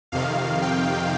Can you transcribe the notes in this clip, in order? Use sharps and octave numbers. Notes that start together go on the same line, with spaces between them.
F2 C3 D#3 F5
G5